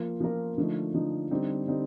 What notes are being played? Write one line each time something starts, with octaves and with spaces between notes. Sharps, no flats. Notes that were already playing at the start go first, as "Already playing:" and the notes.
Already playing: F3 A#3 F4 A#4
F3 A#3 F4 A#4
D3 F3 A3 D#4
D3 F3 A3 D#4
D3 G3 C4 D#4
D3 G3 C4 D#4